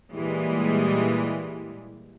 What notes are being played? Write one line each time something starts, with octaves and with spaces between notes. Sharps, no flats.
A#2 E3 G3 G#3